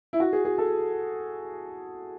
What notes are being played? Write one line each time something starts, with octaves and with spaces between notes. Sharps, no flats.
E4
F#4
G#4
G#4
A4